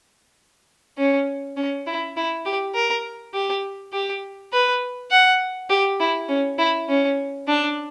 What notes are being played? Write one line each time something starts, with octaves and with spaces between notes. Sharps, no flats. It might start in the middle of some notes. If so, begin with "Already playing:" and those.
C#4
C#4
E4
E4
G4
A#4
G4
G4
B4
F#5
G4
E4
C#4
E4
C#4
D4